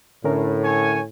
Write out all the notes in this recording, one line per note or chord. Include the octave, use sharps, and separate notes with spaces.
A2 D3 C#4 A#4
C#5 G#5